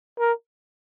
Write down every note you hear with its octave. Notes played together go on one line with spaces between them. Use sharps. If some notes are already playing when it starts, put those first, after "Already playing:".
A#4